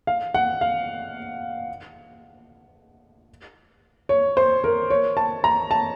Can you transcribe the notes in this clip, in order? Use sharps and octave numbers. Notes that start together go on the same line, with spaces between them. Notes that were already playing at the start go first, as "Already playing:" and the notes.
F5
F#5
F5
C#5
C5
A#4
C#5
A5
A#5
A5